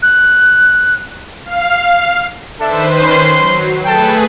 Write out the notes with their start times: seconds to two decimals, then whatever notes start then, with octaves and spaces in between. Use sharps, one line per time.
0.03 F#6
1.45 F5
2.60 D#3 D4 A4 B4 C5 E5
3.01 C#4 C6
3.37 F#3 C7
3.85 A3 G#4 A4 B4 G5 A5